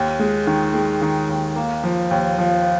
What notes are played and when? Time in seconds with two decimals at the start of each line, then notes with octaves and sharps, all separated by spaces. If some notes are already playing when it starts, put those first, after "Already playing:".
Already playing: D#2
0.19 G#3
0.47 D#3
0.74 G#3
1.02 D#3
1.29 D#2
1.56 A#3
1.84 F3
2.11 D#2
2.38 F3